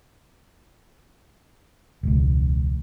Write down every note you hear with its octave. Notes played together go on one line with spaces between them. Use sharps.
E1 C#2